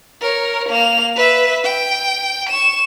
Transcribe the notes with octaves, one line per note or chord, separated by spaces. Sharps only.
A#4 C#5
A#3 F7
B4 E5
G5
C#6 E7